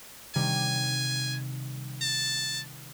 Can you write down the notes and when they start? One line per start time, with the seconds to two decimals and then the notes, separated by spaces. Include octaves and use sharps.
0.35 C3 D#3 G3 G#5
2.02 A5